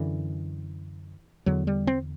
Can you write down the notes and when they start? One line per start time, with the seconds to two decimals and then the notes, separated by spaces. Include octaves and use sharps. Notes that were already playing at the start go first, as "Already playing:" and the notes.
Already playing: F#2 D3 E3
1.46 E2 D3 F#3
1.67 G3
1.87 C4